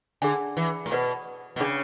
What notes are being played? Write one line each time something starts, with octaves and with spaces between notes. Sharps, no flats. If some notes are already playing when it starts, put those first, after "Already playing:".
D3 D4 G#4 D5 G#5
E3
A2
B2 B4 D5 F#5
B2
C#3 D4 G#4 D5